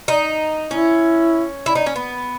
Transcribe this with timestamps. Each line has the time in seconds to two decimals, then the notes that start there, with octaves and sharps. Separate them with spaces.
0.08 D#4
0.70 C#4 E4
1.66 E4
1.75 D#4
1.86 C#4
1.96 B3